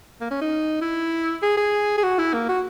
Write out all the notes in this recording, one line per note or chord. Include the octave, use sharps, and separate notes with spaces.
A#3
C#4
D#4
E4
G#4
G#4
G#4
F#4
E4
A#3
F#4